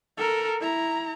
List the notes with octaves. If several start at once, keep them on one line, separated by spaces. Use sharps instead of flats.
A4 A#4
E4 A#5